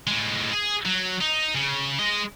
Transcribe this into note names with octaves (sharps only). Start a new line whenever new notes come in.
A2 G#3
G#4
F#3
D#4
C#3
G#3 D#5